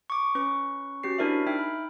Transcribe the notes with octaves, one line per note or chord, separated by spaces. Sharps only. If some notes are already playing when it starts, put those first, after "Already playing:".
C#6 D6
C#4 B4 C#6
C#4 F#4 G4 C7
D4 E4 A#4 C5 D5 E5
D#4 E5 G5 F6
B5